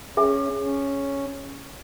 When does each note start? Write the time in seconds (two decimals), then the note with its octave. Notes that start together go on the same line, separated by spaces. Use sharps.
0.17 C#4 G#4 E5 G#5
0.62 C#4